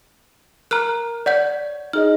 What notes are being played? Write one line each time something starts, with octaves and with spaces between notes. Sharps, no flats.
A#4 A#5 F6 F#6
C#5 D5 F#5 G6
D#4 G#4 D#5 F6